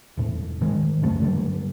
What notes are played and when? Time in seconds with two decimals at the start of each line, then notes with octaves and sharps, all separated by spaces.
0.17 E1 A2
0.61 G#2 D#3 G#3
1.02 C#2 F#2 A3
1.20 G2 D3 F#3 G3